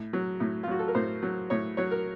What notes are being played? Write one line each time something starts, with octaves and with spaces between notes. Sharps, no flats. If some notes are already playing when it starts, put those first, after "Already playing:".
Already playing: A2
F#3
A2
F4
F#3 F#4
A4
A#4
A2 C5
F#3
A2 C#5
F#3 C#5
A#4